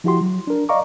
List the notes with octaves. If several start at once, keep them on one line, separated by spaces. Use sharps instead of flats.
F3 E4 F#4 G4 C6
F#3
D4 A#4
D5 D#5 F5 A#5 C#6 D6